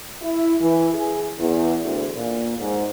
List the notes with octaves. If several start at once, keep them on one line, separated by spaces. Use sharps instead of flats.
E4
E3
G#4
E2
D2
A#2
G#2